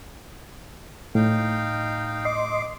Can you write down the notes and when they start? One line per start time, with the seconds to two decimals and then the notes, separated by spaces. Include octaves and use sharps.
1.15 A2 D#4 F5 G5
2.25 D#5 C6 D6